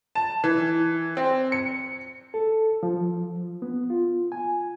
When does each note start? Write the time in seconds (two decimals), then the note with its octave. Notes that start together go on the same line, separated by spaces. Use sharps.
0.15 A5
0.44 E3
1.17 C4
1.52 C#7
2.34 A4
2.83 F3
3.62 B3
3.90 F4
4.32 G#5